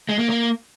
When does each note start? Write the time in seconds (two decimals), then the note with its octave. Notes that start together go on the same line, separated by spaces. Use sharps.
0.09 G#3
0.19 A#3
0.30 A#3